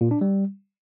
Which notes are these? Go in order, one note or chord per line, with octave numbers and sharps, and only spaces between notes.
A#2
D4
G3